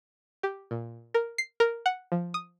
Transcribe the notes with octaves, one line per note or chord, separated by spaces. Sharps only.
G4
A#2
A#4
C7
A#4
F#5
F3
D#6